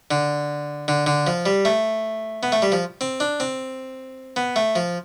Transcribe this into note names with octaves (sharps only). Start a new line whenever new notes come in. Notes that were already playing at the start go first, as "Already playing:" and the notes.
D3
D3
D3
F3
G3
A3
B3
A3
G3
F3
C4
D4
C4
B3
A3
F3